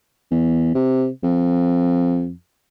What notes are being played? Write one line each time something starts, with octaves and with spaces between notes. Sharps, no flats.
E2
C3
F2